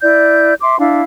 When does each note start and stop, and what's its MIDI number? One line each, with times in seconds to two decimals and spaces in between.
0.01 0.53 64
0.01 0.53 74
0.01 0.53 91
0.60 0.78 76
0.60 0.78 84
0.60 0.78 86
0.79 1.02 62
0.79 1.02 64
0.79 1.02 77